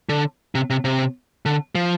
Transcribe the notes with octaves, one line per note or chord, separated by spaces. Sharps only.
D3
C3
C3
C3
D3
F3